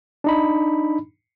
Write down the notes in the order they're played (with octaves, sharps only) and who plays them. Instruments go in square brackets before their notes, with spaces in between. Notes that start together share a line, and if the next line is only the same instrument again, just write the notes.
[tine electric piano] D4 D#4 B5